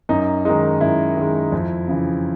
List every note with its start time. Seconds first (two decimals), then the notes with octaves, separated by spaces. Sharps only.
0.09 F#2 D#4
0.45 D#3 G#3 D#4
0.81 F#2 E4
1.17 D#3 G#3
1.52 F2
1.88 C#3 E3